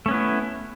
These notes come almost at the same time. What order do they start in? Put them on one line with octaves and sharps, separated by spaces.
A3 C#4 B3 E4